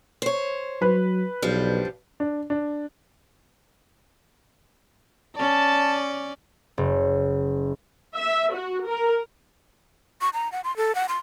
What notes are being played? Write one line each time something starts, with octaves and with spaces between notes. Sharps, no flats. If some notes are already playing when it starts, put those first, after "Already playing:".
C5 C#5
F#3 B4
B1 F3 G3 D4
D4
D4
C#4 D5 A5
F#1
E5
F#4
A#4
C#6
A#5
F#5
C6
A4
F#5
C6